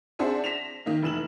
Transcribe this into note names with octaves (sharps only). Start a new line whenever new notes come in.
C4 D4 G#4 C5 E5 F#5
A#6 B6 E7 F7
D#3 A#3 D#4
F1 E3 E7 F#7